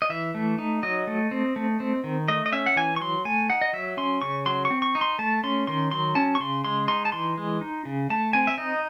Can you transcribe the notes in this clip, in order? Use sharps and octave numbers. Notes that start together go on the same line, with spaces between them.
D#5
E3 E5
A3
D#4
F#3 D#5
A3
C4
A3
C4
D#3
A3 D#5
D#5
C#4 E5
F#5
E3 G#5
C#6
F#3 C6
A3 G#5
D#4 F#5
D#5
F#3 E5
C#4 C6
C#3 C#6
F#3 C6
C#6
C4
C#6
D#4
C6
A3 A5
C#4 C6
D#3 C6
F#3 C6
C#4 A5
C#6
C#3 C6
G#3 C6
D#4 C6
A5
E3 C6
G#3
D#4
C#3
A3 A5
C4 G#5
E5
D#4 D#5